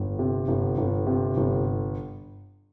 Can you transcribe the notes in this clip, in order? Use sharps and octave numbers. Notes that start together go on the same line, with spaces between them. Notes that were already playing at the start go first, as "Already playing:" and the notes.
Already playing: G1
C3
G1
G1
C3
G1